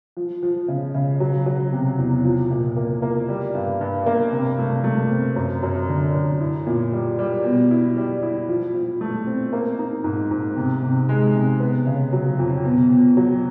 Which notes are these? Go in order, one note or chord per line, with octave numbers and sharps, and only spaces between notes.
F3
F3
C#3
C#3
F#3
F#3
C3
E2
F3
A#2
A#3
A#3
G3
G2
G2
A#3
C3
A3
A3
C4
F#2
F#2
D3
F#2
E4
A#2
G3
G3
B2
E4
G3
E4
F3
F3
A3
C4
A#3
D#4
G#2
G#2
C3
C3
G#3
C3
B3
C#3
F#3
F2
B2
B2
F#3